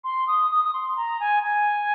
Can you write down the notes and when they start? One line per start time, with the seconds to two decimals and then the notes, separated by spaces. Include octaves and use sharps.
0.04 C6
0.27 D#6
0.51 D#6
0.64 D#6
0.73 C6
0.96 A#5
1.20 G#5
1.43 G#5